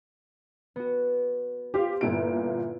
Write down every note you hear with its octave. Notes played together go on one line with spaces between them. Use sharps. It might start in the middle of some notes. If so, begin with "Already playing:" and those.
B3 F#4
F4 G4 C5 F5
G1 A#2 B3 E4 F4 D7